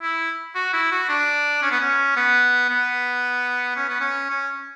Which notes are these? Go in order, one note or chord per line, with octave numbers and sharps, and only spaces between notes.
E4
F#4
E4
F#4
D4
C#4
B3
C#4
B3
B3
C#4
B3
C#4
C#4